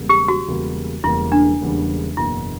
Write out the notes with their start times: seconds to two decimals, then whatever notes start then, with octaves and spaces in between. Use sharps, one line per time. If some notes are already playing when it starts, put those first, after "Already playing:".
Already playing: E1 E2 C#3 G3 A#3
0.09 G4
0.28 F#4
0.47 E1 E2 C#3 G3 A#3
1.03 E1 E2 C#3 G3 A#3 E4
1.32 D4
1.61 E1 E2 C#3 G3 A#3
2.17 F#1 E2 B2 A#3 D4 E4